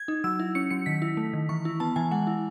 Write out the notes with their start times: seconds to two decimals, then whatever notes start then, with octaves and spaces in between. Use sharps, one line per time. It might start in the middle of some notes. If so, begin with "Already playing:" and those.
Already playing: G#6
0.08 D#4
0.24 F#3 E6
0.39 E4
0.55 C#4 C#7
0.70 F#3 C#7
0.86 D#3 B6
1.02 E4
1.17 A3
1.33 D#3
1.49 E3 C#6
1.65 E4
1.80 B3 A5
1.96 E3 G#5
2.11 G#3 F#5
2.27 E4